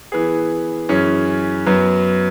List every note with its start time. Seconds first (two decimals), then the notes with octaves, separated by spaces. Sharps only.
0.12 E3 B3 G#4
0.89 F#2 E3 C#4 G#4
1.66 F#2 F#3 B3